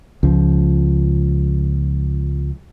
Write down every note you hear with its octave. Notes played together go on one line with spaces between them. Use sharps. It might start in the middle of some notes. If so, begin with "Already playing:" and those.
C#2 F3